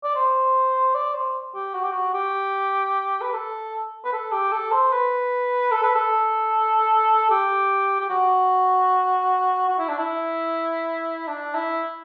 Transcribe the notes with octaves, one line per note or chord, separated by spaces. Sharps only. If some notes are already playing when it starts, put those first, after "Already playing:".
D5
C5
D5
C5
G4
F#4
G4
F#4
G4
B4
A4
B4
A4
G4
A4
C5
B4
A4
B4
A4
G4
G4
F#4
F#4
E4
D4
E4
D4
E4